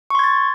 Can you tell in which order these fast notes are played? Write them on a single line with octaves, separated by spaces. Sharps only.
C#6 C6 G#6 A6